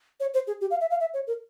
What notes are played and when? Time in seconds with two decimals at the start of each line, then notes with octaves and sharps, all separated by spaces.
0.20 C#5
0.34 C5
0.47 G#4
0.61 G4
0.71 F5
0.81 E5
0.90 F5
1.00 E5
1.14 C#5
1.27 A#4